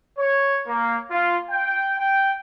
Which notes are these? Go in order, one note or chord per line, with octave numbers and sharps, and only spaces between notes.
C#5
A#3
F4
G5
G5